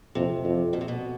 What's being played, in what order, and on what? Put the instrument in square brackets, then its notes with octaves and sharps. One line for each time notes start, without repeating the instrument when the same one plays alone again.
[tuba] F2 [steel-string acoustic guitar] C3
[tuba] F2
[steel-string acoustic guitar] B2
C3
B2